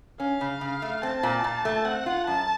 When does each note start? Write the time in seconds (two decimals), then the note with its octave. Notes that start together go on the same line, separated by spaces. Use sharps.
0.20 C#4 F5
0.41 C#3
0.61 C#3
0.82 A3
1.02 C4 A5
1.23 A#2
1.44 A#2
1.65 A3
1.85 C4 F#5
2.06 F4
2.27 F#2 A5